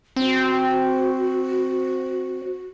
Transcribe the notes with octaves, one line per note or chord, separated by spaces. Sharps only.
C4 F#4